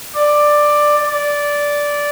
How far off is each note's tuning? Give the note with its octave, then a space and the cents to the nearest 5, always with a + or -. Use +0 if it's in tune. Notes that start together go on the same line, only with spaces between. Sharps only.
D5 +10
D5 -10